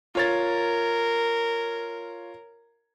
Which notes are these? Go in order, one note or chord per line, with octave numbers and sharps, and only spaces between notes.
F4 A#4 C#5 A6